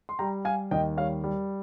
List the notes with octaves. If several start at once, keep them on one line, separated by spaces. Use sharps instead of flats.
C6
G3 G5 A#5
G3 F5 G#5
D#2 D#5 G5
G3 C#5 F5
G3